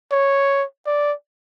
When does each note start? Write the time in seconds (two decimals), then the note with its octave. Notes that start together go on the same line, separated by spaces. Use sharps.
0.12 C#5
0.87 D5